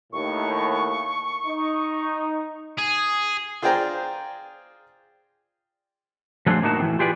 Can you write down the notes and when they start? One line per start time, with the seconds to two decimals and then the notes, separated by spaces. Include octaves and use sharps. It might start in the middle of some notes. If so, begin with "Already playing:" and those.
0.13 D#2 A2 C#6
1.47 D#4
2.78 G#4
3.62 F4 G#4 C5 D5 G5 A#5
6.46 F3 F#3 A3 D4 G#4 C5
6.63 A2 A#3 D#4 F#4 A5
6.80 A2 E3 C4
6.99 F4 G4 G#4 B4 D5